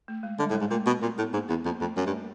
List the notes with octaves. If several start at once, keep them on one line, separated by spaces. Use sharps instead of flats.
A3
G#3
D3 G3
A2
G#3
G#2
A#2 A3
B2
A#2 C4
A2 B3
G#2 A#3
E2 B3
F2 A#3
F2 A3
F#2 G3
G2 A3
A#3